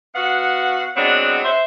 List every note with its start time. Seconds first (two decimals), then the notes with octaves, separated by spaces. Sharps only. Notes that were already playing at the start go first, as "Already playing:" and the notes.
0.15 B3 F#4 F5 F#5
0.97 F#3 G#3 B3 C4 D4
1.45 C5 E5